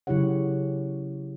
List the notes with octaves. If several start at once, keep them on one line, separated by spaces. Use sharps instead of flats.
C#3 F#3 E4 G4 C#5 F#5